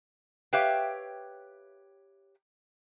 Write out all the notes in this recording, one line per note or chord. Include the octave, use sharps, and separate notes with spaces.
G4 B4 C#5 E5 F5 G5